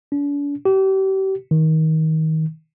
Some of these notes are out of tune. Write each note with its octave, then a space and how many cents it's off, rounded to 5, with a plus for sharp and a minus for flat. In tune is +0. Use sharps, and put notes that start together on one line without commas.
D4 -45
G4 -35
D#3 +25